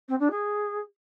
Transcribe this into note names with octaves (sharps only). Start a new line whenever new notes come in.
C4
D4
G#4